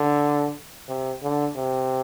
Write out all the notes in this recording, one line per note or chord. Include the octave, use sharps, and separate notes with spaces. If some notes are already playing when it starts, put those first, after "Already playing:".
Already playing: D3
C3
D3
C3